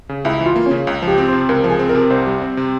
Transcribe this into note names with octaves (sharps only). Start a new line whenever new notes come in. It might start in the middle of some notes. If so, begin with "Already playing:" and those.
C#3
C#2 E4
E3
F4
A#3
C#4
C#3
C#2
F3
G4
C4
C3 C5
C#2 A#4
F3
G#4
C4
A#4
C3
C2 C5
G3
C4
C3